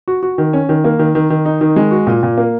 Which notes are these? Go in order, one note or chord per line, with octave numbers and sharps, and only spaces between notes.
F#4
F#4
D#3
C#4
D#3
A#3
D#3
D#3
D#3
D#4
D#3
G#3
F#4
A#2
A#2
A#3